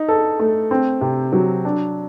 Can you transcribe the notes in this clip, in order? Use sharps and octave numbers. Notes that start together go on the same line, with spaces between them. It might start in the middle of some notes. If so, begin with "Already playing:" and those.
Already playing: D#4
A4
A3
C4
C3
F#3
D4